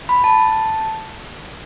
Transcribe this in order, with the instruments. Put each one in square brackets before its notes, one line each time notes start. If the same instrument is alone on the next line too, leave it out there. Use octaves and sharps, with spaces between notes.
[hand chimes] B5
A5